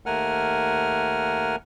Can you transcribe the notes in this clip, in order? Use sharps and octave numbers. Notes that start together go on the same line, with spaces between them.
D#2 A3 A#4 F#5 G#5 F6